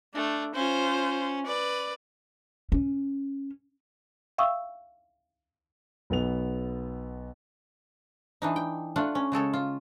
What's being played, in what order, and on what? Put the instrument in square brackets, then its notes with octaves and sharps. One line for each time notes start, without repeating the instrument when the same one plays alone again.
[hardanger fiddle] A3 [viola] D4
[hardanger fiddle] C#4 [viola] F4 C5
[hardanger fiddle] B4 [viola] D5
[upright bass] C#4
[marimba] E5 F5 G5 C#6 D#6 E6
[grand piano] B1 B3 F7
[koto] E3 D4 D#4
G5
A3 D4 F4 F#5
C#4
C#3 G#3 A4 C#5
F4